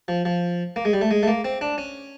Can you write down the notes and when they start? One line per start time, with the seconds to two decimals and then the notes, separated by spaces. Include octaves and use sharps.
0.08 F3
0.25 F3
0.76 A#3
0.85 G#3
0.93 G3
1.01 A3
1.11 G#3
1.23 A3
1.27 A#3
1.45 C4
1.61 D4
1.78 C#4